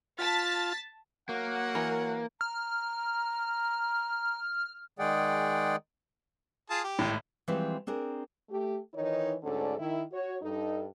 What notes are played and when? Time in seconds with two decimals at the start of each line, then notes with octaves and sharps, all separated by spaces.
0.19 F4 A5 A6 B6
1.29 F#3 A#3 C#5 F#5
1.75 E3 A#4
2.41 A#5 F6
4.99 D#3 G#3 G#4 D5 F#5 G5
6.70 F4 G#4 A5
6.84 G4
6.99 G#1 A2
7.48 E3 F3 G3 G#3 C4 E4
7.87 C4 D4 G#4 A#4
8.50 A3 G4
8.95 D#3 E3 D#4 C#5
9.43 D2 G#2 D3 C#4 A4 D5
9.78 D#3 E4
10.12 F#4 C#5
10.42 G2 D#4 A4